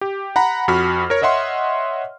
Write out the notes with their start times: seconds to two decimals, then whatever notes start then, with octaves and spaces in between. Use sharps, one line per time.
0.01 G4
0.36 F#5 A#5 B5
0.68 F2 F#4 B5 F6
1.10 A#4 C#5
1.22 C#5 D#5 E5 F#5 C6